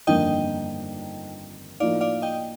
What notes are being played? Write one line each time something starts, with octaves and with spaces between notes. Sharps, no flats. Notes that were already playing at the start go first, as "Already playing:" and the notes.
G1 F2 D#3 A#3 D4 D#5 G5
A2 F3 A#3 D#4 D5 F5
D5 F5
D#5 G5